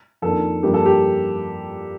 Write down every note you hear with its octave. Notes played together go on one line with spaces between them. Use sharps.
F2 D#3 A#3 D4 A4
G2 F3 A#3 G4
A4
G4